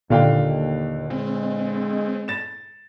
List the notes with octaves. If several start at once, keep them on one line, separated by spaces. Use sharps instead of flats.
D#2 A#2 D3 F5 G5
G#3 C4
A6 E7